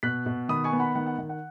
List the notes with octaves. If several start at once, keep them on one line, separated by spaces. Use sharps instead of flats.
B2 F#6 B6
B2
D#3 B5 D#6
G#5 C#6
B3
F#5 B5
D#3 F#5
F#5
D#3
F#5